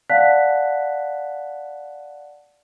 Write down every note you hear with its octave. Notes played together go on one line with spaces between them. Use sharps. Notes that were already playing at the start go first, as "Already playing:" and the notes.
D5 F5 F#5 A5 F#6 B6